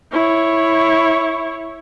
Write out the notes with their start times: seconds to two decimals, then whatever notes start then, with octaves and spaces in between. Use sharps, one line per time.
0.13 E4 C#5